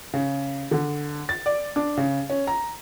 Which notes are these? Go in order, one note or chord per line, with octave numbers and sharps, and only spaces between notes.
C#3
D3
A6
D5
D4
C#3
C#4
A#5